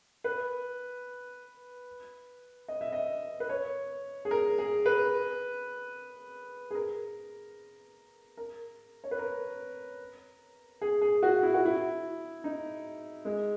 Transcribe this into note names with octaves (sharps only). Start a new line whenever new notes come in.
B4
D#5
E5
D#5
B4
C#5
G#4
A#4
G#4
B4
G#4
A#4
A#4
C#5
B4
A#4
G#4
G#4
F#4
E4
F#4
E4
D#4
G#3